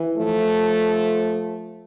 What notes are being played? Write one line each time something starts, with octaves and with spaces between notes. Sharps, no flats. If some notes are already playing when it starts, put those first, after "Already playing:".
Already playing: E3
F3 A3